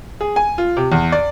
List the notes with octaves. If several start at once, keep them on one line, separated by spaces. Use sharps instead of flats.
G#4
G#5
F4
C3
E2
D5